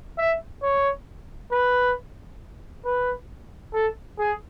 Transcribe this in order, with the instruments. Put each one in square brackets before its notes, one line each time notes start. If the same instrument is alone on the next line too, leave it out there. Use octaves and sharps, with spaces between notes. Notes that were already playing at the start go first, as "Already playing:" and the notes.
[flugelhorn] E5
C#5
B4
B4
A4
G#4